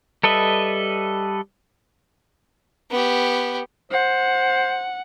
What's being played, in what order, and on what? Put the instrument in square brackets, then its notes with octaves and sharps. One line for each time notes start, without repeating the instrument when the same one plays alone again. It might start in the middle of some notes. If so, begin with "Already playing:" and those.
[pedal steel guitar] G3 A4 B4 D#5 E5
[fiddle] B3 G4
[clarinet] C5 [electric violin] F#5